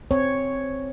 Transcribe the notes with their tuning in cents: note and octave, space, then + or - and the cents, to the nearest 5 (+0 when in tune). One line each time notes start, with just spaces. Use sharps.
C4 +0 C#5 +0